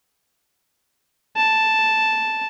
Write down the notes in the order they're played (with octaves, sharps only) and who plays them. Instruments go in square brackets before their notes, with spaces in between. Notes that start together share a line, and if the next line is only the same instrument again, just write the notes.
[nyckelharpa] A5